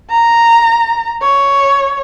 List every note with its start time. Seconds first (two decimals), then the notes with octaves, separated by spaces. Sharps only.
0.10 A#5
1.22 C#5